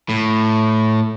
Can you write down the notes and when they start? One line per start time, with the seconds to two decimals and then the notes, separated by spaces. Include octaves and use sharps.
0.09 A2